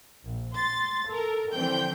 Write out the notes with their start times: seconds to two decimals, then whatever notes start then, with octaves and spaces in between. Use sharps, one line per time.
0.24 A#1
0.54 C6 A6
1.08 A4 A#4
1.53 D3 E3 F3 C4 G5 G6